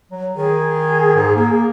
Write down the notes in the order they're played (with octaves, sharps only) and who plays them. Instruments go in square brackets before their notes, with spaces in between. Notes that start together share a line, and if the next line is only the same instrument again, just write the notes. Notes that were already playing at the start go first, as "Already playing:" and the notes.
[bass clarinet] F#3
[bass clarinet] D#3 [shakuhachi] G#4
[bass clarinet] G#2
A#3